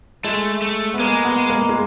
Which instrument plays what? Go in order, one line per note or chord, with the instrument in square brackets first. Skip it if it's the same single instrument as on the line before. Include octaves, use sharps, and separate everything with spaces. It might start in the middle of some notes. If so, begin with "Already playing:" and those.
[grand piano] G#3 [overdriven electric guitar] A3
[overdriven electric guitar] A3
[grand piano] B3
[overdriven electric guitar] G#3 [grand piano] A#3
[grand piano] B3
A#3
G#3